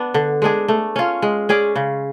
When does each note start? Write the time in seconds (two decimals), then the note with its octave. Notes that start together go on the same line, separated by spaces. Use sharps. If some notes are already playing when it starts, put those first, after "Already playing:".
Already playing: B3 D4
0.14 D3
0.42 G#3 D4 G#4
0.68 A3
0.96 C#4 F4
1.22 G#3
1.49 C#4 G#4 D5
1.76 C#3